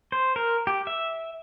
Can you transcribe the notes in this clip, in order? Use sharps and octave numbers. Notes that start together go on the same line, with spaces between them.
C5
A#4
G4
E5